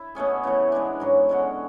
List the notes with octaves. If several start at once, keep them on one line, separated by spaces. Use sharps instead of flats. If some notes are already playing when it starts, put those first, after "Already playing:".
Already playing: E4
B2 A3 C#4 G#4
C#3 E3 A3
G#3 B3 D4
G#2 F#3 C#4
D3 G#3 C#4 F#4